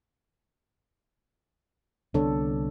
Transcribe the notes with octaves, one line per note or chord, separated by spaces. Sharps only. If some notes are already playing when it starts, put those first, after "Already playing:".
C2 D3 B3 D4 A4 C#5